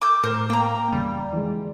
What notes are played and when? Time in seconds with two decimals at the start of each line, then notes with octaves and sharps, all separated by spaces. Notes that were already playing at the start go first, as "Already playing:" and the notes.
0.02 D6 E6 G6
0.24 A2 A#4 C5
0.50 A#3 G5 A#5
0.92 E2 C#3 G3
1.33 E3 F3 G#3